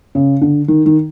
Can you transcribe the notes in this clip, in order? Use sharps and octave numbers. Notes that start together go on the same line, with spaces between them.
C#3
D3
D#3
D#3